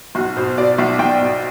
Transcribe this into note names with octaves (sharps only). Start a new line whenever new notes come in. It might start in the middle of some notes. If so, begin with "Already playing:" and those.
B1 F#4
B2 C5
B2 D5
B1 E5
B1 G5
B2